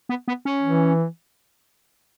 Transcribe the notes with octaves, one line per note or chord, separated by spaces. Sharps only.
B3
B3
C#4
E3